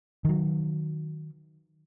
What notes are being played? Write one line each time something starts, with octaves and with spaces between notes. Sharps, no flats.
D#3 F#3